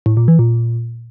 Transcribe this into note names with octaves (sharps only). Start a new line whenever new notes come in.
A2
A#2
E3
A#2